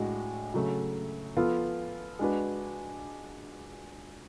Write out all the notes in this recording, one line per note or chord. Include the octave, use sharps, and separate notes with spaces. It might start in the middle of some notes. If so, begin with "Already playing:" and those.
Already playing: A2 G#3 D4 F#4
C#3 F#3 A3
F3 B3 F4 A4
G#3 D4 F#4 B4